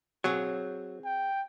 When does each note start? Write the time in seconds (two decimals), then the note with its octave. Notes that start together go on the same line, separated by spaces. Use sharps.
0.24 F#3 C4 G#4 C#5
1.05 G5